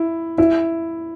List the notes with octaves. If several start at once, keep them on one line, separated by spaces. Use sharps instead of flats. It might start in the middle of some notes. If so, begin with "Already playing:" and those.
Already playing: E4
E4